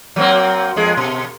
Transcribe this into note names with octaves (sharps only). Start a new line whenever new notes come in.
F#3 A#3 C4
F2 G#3 G#4
B2